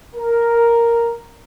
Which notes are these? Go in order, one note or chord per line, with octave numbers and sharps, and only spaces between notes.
A#4